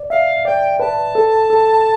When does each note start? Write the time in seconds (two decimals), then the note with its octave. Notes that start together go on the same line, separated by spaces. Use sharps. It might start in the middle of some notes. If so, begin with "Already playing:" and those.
Already playing: D5
0.10 E5 F5
0.45 D5 G5
0.80 B4 A5
1.15 A4
1.50 A4